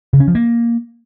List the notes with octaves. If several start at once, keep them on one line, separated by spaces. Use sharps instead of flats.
C#3
C#4
F3
A#3